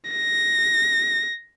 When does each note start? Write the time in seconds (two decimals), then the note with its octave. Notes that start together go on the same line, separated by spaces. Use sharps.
0.11 A#6